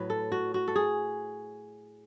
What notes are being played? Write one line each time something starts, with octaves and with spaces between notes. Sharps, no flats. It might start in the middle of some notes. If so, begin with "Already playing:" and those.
Already playing: A2 F#3 B4
A4
F#4
F#4
A4
G#4